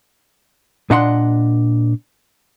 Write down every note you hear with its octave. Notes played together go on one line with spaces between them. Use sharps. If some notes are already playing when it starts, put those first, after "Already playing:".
A#2 D4 D#5 F#5 A#5 C6